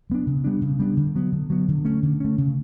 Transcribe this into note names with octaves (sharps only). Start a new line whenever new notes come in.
F#3 B3 D4
C#3
G3 B3 D4
C#3
G3 B3 D4
D3
F#3 B3
D3
F#3 B3
D3
A3 C#4
D3
A3 C#4
C#3